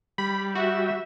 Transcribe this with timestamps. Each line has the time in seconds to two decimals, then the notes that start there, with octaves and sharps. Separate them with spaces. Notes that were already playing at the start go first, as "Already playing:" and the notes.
0.18 G3 B5
0.55 F#4 E5